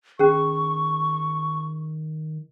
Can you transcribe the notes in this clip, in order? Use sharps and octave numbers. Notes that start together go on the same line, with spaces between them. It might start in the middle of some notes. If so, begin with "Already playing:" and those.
D#3 C#4 G#4 C#6